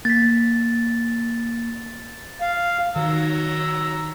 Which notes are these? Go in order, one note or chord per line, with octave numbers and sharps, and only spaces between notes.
A#3 A6 B6
F5
D#3 F#3 A#5 E6